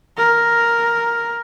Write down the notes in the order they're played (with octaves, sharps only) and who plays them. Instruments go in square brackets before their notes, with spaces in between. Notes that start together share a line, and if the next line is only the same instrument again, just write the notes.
[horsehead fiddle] A#4